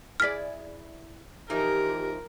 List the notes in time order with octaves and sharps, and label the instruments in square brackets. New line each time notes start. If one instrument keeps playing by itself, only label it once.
[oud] E4 G#4 D5 [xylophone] F6 B6
[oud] E3 F3 D#4 [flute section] G4 [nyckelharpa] A#4